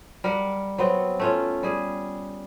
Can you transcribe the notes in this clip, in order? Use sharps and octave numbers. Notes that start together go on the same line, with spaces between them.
G3 A#4 F5 F#5
F#3 B3 C4
A3 C#4 F4
G3 G#4